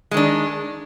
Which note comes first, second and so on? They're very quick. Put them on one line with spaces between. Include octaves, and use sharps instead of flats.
G#3 D#3 D4